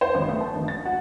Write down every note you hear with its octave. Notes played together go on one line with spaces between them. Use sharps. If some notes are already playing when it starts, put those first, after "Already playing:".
C5
G#1
A3
A5
G#1
A6
F#4